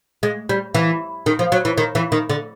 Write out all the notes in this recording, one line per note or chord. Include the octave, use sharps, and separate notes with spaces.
G#3
G3
E3
D#3
F3
F#3
E3
D#3
E3
D#3
D3